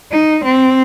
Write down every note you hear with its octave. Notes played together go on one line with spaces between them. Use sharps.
D#4
C4